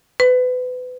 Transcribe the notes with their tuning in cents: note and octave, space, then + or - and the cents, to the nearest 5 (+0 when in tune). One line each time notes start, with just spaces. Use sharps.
B4 +30